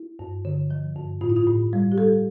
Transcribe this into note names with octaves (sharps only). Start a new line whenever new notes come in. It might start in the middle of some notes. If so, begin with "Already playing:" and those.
Already playing: E4
G2
D3
F3
G2
A2 F4
E4
F4
A2
G3
G4
G3 A4